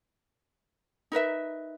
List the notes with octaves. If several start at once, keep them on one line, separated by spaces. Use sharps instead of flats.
D#4 A#4 B4 E5